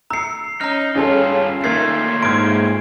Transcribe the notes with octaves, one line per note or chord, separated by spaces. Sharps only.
A#5 E6 C7 C#7
C#4 D#4 A#5 F6
G2 C#4 F4 G#4 A4 C#5
A#2 D#3 A3 A#3 G#6 A6 C7
G#2 C6 F6 G#6 D7